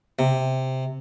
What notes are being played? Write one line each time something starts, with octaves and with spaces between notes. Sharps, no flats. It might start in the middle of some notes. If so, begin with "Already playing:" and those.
C3